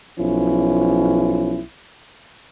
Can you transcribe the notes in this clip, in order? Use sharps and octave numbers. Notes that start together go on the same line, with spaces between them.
B1 F3 C#4 E4